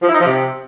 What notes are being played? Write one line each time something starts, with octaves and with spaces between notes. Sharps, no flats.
F3
E4
D#4
F3
C3